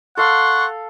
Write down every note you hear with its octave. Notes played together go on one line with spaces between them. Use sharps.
A4 F5 F#5 C6 C#6